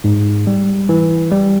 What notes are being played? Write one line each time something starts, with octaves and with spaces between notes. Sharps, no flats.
G#2
G3
E3
G3